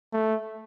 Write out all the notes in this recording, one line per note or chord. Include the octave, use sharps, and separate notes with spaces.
A3